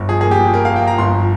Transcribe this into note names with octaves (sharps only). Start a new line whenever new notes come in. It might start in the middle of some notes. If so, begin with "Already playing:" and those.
Already playing: G1
F3 G#4
A#3 G#4
G4
F3
F3 A#4
A#3 F5
G5
F3 A#5
G1 C6
F3